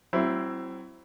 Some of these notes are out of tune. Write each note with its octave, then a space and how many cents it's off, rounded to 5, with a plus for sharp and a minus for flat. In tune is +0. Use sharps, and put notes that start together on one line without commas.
F#3 +40 C4 +5 E4 +20